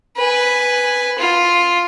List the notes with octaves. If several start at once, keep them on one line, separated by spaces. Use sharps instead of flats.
B4 G#5
F4